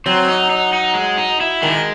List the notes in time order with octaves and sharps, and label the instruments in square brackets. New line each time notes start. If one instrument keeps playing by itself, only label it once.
[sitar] F#3 [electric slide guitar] C4
[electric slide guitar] D#4
D#4
D#4
G#3
D#4
E4
[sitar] D#3 [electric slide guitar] G#3